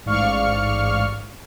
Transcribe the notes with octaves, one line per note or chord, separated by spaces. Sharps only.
A1 G#2 D5 F5 C#6 F6